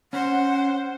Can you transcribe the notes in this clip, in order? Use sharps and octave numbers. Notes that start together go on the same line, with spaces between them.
C#4 C5 F#5